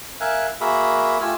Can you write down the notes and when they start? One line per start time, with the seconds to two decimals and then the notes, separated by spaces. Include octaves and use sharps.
0.21 A#4 E5 F5 G#5 F#6
0.61 A#3 F#4 G#4 A#4 E5 B5
1.21 A3 F4 G4 G#5 E6 F6